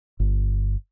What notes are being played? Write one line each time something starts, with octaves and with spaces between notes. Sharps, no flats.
G1